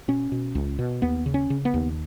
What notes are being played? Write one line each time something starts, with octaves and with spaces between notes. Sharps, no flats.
B2 C#4
B2
C#2
B2
D#2 B3
C#3
C#4
C#3
B3
D#2